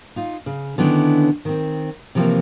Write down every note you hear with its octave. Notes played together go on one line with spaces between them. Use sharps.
D#4 F4
C#3
D3 D#3 B3 C#4 D4 E4
D#3 C4
C3 E3 F3 A3 A#3 C4